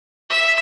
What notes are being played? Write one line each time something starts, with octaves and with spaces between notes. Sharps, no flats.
E5